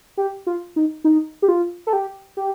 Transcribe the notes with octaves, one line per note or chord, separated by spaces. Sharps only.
G4
F4
D#4
D#4
G4
F4
A4
G4
G4